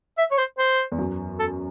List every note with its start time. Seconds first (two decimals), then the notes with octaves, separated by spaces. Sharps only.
0.18 E5
0.31 C#5
0.38 C5
0.58 C5
0.92 E2
0.98 F#2
1.39 A4